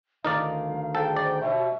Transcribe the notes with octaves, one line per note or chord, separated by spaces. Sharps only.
D2 D#3 D#4 A#4 D5 F5
G#2 A4 G5
C5 D5
D#2 B2 E5